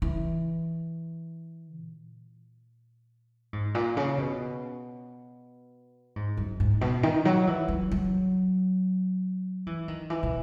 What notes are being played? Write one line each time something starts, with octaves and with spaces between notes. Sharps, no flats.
E3
A#2
G#2
A#2
C#3
B2
G#2
F#2
G#2
B2
D#3
F#3
E3
F#3
F#3
E3
D#3
E3
A#2